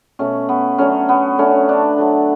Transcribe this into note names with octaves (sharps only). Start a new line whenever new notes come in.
B2 A3 C#4
B3
D3 F#3 A3 C#4
B3
D3 A3 C#4
D4
D3 F#3 A3